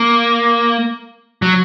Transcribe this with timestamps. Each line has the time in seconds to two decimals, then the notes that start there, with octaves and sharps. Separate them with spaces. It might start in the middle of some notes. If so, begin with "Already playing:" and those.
Already playing: A#3
1.42 F#3